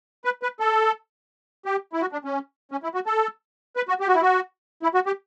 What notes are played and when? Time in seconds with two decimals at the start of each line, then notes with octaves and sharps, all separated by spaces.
0.25 B4
0.43 B4
0.60 A4
1.66 G4
1.93 E4
2.01 F#4
2.12 D4
2.25 C#4
2.72 C#4
2.83 E4
2.94 F#4
3.06 A4
3.77 B4
3.89 F#4
4.00 G4
4.08 F#4
4.14 E4
4.22 F#4
4.83 E4
4.95 F#4
5.06 G4